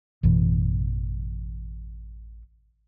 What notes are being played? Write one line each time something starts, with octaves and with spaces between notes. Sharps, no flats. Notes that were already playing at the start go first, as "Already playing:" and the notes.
A1 F#2 B2 E3